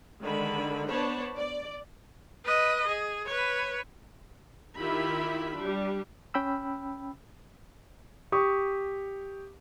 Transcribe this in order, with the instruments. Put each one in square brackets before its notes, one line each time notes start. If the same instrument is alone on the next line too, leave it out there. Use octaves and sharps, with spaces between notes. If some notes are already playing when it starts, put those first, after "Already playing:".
[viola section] D3 D#3 G#3 B5
B3 D4 C5 C#5 A5 B5
D5
[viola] B4 D#5
G#4
B4 C#5
[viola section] D#3 E4 F4 G4 E5 B5
G3 D4
[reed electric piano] C#4 G5 B5 E6
[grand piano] G4 C#6 D#6